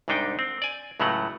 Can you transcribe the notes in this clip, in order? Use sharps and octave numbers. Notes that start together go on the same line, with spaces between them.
C2 G#2 C3 D4 D#4 G5
C4
D5 G#5
C#2 A2 C#3 F#3 A3 F#5